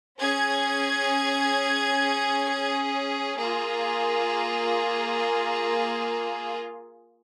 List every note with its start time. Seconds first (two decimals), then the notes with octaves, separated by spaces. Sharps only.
0.21 C#4 G#4 G#6
3.40 A#3 F4 G#4